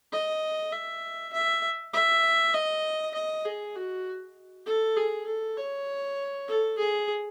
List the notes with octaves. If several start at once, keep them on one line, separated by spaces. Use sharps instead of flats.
D#5
E5
E5
E5
D#5
D#5
G#4
F#4
A4
G#4
A4
C#5
A4
G#4